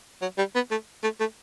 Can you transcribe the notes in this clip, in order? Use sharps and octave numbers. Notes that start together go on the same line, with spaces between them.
F#3
G3
B3
A3
A3
A3